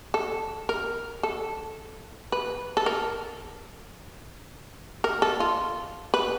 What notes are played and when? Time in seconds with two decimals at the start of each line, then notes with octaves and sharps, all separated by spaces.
0.14 A4
0.69 A#4
1.23 A4
2.32 B4
2.77 A4
2.86 A#4
5.04 A#4
5.22 A4
5.40 F4
6.14 B4